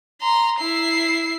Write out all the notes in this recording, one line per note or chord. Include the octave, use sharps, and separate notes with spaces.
A#5 C6
E4 C7